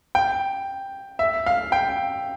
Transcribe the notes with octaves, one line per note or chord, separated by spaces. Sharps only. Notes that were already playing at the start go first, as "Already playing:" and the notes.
G5
E5
F5
G5